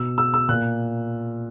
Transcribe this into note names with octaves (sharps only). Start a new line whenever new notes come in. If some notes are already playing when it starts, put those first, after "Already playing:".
Already playing: B2 E6
E6
E6
A#2 F#6